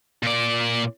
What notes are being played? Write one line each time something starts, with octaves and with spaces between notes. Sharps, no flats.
A#2 D5